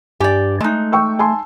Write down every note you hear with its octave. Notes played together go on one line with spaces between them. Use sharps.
G2 G4 D5 G#5
G#3 A3 D#4
G5 C#6 E6
G#5 A5 C6